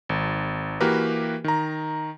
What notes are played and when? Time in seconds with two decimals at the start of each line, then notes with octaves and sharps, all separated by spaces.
0.09 G#1
0.80 E3 A#3 F#4 G4 A#4 B4
1.44 D#3 A#5